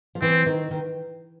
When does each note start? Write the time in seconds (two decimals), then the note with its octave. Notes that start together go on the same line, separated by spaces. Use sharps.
0.15 F3
0.22 E3 C4
0.46 D#3
0.71 D#3